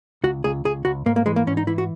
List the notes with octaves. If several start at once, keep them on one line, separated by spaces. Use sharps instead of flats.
C#2 F#4
C#2 G#4
C#2 G#4
C#2 F#4
G#2 A#3
A#3
E3 G#3
A#3
G#2 C#4
D#4
E3 E4
F#4